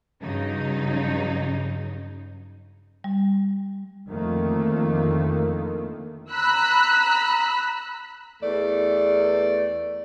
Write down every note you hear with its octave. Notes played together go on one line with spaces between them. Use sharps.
G2 C#3 F#3 D#4
G3
F2 D3 D#3 A3 A#3
A#5 B5 E6 F#6
E2 A3 D5